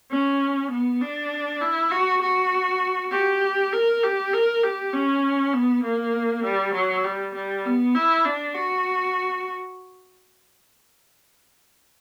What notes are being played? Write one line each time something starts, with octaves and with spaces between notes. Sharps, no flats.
C#4
B3
D4
E4
F#4
F#4
G4
A#4
G4
A#4
G4
C#4
B3
A#3
G3
F#3
G3
G3
B3
E4
D4
F#4